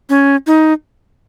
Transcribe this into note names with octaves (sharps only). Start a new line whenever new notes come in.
C#4
D#4